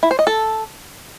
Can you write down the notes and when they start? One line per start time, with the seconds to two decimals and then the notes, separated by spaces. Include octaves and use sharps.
0.03 E4
0.11 C5
0.19 D#5
0.27 A4